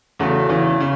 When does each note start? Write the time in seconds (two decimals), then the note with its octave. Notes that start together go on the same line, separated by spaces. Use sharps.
0.19 E2 C#3 A3 F#4
0.49 E2 C#3 E3
0.80 C#3